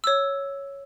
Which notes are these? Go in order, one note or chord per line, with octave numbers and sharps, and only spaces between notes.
C#5 E6